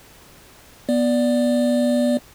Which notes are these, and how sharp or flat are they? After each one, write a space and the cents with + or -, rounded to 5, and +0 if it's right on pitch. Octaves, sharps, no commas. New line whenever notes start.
B3 -15 D5 +0